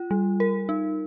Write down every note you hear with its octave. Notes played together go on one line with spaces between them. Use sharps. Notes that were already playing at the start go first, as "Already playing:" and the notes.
Already playing: F4
G3
A#4
D#4